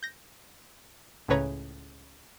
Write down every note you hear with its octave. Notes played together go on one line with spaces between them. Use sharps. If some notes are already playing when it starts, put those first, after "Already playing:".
G6 A#6
C#2 A2 C#3 B4 C#5 A#5